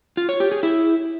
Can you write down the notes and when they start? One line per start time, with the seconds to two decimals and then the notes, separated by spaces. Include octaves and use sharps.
0.17 F4
0.29 C#5
0.40 G4
0.52 G#4
0.63 E4